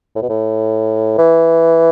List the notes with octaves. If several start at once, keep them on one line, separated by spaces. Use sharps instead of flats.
A2
B2
A2
E3